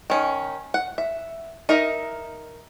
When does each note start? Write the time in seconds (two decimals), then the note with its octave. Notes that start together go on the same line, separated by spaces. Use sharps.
0.10 D#3 C#4
0.74 F#5
0.98 E5
1.69 D#4 A#4 D#5 E5